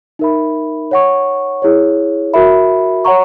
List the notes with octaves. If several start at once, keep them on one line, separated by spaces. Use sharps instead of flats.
D#4 A#4 E5 B5
C#5 F#5 C#6
E4 G#4 C#5
F#4 A#4 E5 B5
C#5 F#5 A#5 C#6